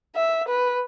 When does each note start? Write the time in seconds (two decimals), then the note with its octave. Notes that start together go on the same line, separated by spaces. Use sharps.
0.15 E5
0.48 B4